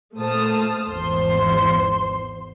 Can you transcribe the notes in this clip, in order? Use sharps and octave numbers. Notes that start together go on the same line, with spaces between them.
A#2 A3 C5 A5 D#6 F6
G#1 E2 C5 C6